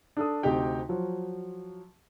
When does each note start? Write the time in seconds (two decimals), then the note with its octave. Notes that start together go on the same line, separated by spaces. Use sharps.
0.17 D4 A4 D#6
0.43 D2 C3 D#4 G4 G5
0.89 F3 F#3